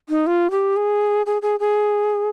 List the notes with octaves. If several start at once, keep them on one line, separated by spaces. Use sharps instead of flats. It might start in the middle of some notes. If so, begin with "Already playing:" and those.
D#4
F4
G4
G#4
G#4
G#4
G#4